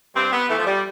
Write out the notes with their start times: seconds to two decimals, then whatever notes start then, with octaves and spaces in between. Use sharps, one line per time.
0.16 G2 C4
0.32 B3
0.49 E3 A3
0.58 F3
0.66 G3